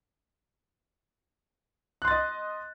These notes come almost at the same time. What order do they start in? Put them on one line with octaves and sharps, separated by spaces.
F#6 C6 A6 D#5